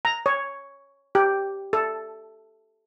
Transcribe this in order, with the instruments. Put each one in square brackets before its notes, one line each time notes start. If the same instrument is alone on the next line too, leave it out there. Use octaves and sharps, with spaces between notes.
[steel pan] A#5
C#5
G4
A4